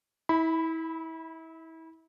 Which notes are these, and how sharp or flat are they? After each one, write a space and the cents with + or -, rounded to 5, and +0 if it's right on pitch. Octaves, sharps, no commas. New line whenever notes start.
E4 -30 B5 +5